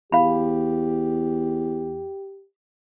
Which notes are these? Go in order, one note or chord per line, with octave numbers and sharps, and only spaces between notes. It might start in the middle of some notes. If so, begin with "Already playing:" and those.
E2 G4 F5 B5